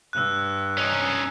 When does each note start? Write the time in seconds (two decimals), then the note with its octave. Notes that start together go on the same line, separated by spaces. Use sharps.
0.13 G2 E6 F#6
0.78 C#4 D#4